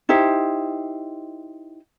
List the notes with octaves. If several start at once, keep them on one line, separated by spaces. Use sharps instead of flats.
D#4 E4 G4 C5